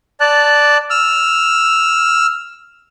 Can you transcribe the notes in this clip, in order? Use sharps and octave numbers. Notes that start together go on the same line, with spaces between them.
D5 A5 F#6
E6 F6